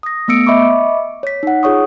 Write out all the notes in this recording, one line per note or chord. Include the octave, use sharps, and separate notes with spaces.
D#6 A#6
A3 B3 E6 C#7 D7
D#5 E5 B5 C#6 D6
C#5 B6
D#4 F#5
F4 G#4 C#5 C#6 D#6